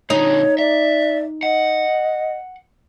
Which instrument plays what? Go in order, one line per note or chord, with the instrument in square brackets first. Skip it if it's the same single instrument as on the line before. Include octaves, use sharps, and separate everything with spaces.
[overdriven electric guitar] A#2 D3 [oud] D#4 [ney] C#5
[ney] D5 [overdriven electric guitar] E5
[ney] D#5 [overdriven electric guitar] F#5